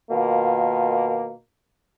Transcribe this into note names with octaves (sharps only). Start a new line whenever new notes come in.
B2 D#3 A#3 F4